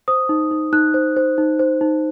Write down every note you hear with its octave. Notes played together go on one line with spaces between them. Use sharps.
C5 D#6
D#4
D#4
D#4 F#6
C5
C5
D#4
C5
D#4